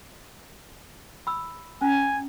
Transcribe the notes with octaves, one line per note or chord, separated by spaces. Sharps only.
B5 E6
C#4 G#5 A#5